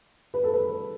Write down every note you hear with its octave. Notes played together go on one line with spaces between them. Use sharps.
B4
A4
B4